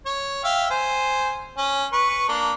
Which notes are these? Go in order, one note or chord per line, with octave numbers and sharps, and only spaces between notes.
C#5
E5 F5 G5
C5 G#5
C#4
B4 C#6
A#3 D4